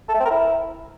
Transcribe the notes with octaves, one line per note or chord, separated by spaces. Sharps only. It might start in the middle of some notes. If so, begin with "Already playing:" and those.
A4
A3
C4
A#4
E4